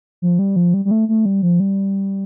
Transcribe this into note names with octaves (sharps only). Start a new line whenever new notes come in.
F3
G3
F3
G3
G3
A3
A3
G3
F3
G3